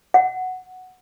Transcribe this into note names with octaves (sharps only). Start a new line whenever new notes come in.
F#5